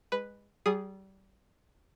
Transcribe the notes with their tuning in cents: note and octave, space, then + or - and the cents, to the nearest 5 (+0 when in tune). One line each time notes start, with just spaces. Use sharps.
G#3 -25 B4 +0
G3 -30 G#4 +0 D#6 -5